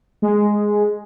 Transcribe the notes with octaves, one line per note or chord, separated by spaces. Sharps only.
G#3